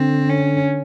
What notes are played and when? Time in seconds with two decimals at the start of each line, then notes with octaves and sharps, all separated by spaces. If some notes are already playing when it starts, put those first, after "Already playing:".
Already playing: D3 C4
0.29 C#4